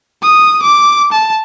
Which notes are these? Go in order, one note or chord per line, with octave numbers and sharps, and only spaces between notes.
D#6
D6
A5